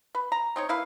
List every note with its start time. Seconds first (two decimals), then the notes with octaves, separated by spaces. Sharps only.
0.15 B4
0.32 A#5
0.56 C4 D#4 C#5
0.69 A#3 E4 B4 F5